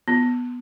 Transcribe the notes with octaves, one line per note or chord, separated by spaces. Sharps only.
B3